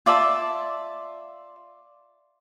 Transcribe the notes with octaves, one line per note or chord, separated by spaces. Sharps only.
F4 D5 E5 A5